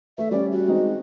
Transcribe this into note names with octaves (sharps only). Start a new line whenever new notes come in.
A3 E5
G3 C#4 D5
F#4
G#3 C4 D#4